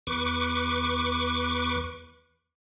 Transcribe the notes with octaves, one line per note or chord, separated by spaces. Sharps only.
E2 B4 C#6 D6